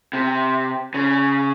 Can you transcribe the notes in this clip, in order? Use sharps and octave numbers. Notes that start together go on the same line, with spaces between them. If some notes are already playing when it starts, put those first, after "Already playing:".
C3
C#3